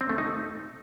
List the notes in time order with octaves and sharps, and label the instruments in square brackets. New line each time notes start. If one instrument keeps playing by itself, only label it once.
[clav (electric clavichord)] C4
A3
D#4